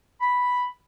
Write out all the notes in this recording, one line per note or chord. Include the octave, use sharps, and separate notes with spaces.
B5